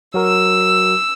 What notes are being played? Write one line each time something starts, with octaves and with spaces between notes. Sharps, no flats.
F#3 F#4 A#4 E6